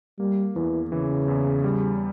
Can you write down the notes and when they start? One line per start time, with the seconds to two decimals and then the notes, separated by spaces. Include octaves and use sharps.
0.19 G3 A#3
0.56 E2 E3
0.92 C#3 E3
1.28 E2
1.64 G3